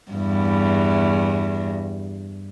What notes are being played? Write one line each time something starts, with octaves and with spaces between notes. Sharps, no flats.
E2 G2